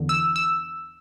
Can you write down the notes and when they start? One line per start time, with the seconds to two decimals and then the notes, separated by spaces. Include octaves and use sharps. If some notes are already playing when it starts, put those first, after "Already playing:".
Already playing: E2 D3
0.09 E6
0.36 E6